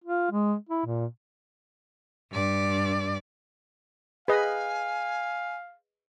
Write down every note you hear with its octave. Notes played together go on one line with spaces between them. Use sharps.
F4
G#3
E4
A#2
G2 D5
G#4 B4 D#5 F5 G#5